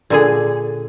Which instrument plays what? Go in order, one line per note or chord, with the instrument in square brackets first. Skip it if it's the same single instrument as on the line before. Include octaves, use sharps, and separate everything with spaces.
[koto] A#2 D3 G#4